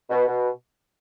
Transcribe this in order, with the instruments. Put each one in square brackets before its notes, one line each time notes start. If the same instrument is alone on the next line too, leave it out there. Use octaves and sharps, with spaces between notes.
[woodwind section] B2
B2